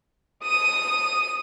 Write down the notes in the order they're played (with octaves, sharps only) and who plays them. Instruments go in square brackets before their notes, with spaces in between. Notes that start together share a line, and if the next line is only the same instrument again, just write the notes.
[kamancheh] D#6 [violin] D#7